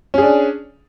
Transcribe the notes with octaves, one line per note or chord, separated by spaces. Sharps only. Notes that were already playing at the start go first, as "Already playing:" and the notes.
C#4 D4 G#4